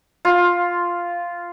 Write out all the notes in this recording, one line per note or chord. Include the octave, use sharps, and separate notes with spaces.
F4